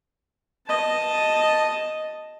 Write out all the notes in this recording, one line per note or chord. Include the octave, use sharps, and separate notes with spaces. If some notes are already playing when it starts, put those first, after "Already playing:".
D#5 A5